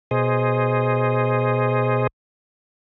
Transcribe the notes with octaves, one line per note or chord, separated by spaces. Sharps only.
B2 G#4 C5 D#5